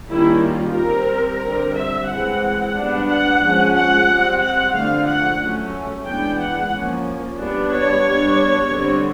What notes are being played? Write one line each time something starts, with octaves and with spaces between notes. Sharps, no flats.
D#3 G3 A#3 C#4 E4
F4
G3 C4 A#4
D3 G3 C4
E5
E3 G#3 C4 F#5
G3 B3 D4
F#5
F3 G#3 C#4
F#5
G3 C4
F#5
D3 F3 A3 F5
F#5
F#3 A3 C#4
E3 G#3 B3 D4 G5
F#5
F3 A#3 C#4
G3 B3 D4
C#5
G3 B3 D4
D3 G3 C4